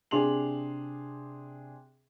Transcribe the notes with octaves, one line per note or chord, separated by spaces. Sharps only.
C3 D4 G#4 C6 F7 F#7